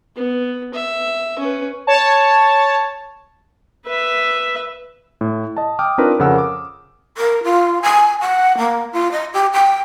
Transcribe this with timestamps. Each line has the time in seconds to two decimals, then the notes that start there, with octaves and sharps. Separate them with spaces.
0.16 B3
0.74 E5
1.39 C#4 B4
1.87 C#5 A5
3.87 B4 E5
5.21 A2
5.57 D#5 A5
5.79 G5 D6 D#6 F6
5.98 C4 D4 D#4 F4 A#4 B4
6.19 F2 C#3 A#4 F#5 E6
6.38 D6
7.17 A#4
7.44 F4
7.82 G#5
8.21 F#5
8.58 A#3
8.92 F4
9.11 D#5
9.33 G4
9.53 G5